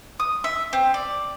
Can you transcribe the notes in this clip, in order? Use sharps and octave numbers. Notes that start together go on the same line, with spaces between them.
D#6
E5
C4
D5